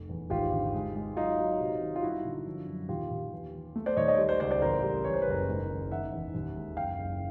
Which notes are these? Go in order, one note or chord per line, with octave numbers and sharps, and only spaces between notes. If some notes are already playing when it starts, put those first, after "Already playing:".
Already playing: F1
E2
G#1 F4 G4
D3
G#3
G#3
F#3 D#4 F4
F#3
C3
D#3
F4
G2 E4 F#4
D3
F3
F#2
D#2 F4 G4
D#2
E3
E3
A3
C5 D5
D#2 C#5 D#5
C#5 D#5
G3
C5 D5
C#2 C5 D5
C5 D5
A1 A#4 C5
G3
E3 C#5
C5
B4
F#1 A#4 C5
G#2
G#1
D#3 E5 F#5
E2
D#2
G#3
F#1 F5 G5
F#1